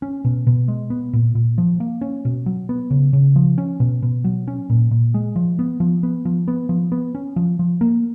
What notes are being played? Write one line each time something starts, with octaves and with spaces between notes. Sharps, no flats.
C#4
B2
B2
G#3
B3
A#2
A#2
F3
A#3
C#4
B2
F#3
B3
C#3
C#3
F3
C#4
B2
B2
F#3
C#4
A#2
A#2
G#3
F3
B3
F3
B3
F3
B3
F3
B3
C#4
F3
F3
A#3